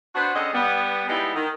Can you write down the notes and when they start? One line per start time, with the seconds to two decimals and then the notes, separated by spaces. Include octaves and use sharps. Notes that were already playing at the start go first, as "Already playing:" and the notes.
0.15 B3 D4 F#4 B4 C5
0.34 D3 C4 C#4 G#4 D#5
0.53 G3 B3
1.08 G3 G#3 B3 D#4 E4 G4
1.35 D#3